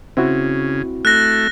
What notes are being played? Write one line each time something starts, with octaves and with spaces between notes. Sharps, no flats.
C#3 C4 E4 F#4
A3 F#6 A#6